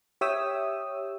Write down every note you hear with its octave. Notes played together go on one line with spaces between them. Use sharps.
G4 C#5 E5 G5 D#6 E6